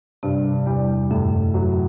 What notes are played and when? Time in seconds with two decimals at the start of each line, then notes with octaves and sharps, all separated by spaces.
0.23 G2 C3
0.66 E2 G3
1.10 F#2 A2
1.54 F#3